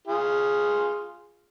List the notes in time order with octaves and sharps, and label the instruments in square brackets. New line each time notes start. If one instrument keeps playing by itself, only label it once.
[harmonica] F4 G#4